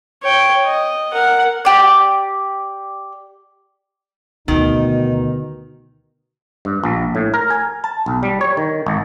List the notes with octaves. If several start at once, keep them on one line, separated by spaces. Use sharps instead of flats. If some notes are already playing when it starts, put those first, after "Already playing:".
C#5 G5
D#5
A#4 F#5
G4 D5
D2 B2 D#3 D#4
G2
A#1
A2
A#4
G#5
A5
B1
G3
C#5
D#3
G#1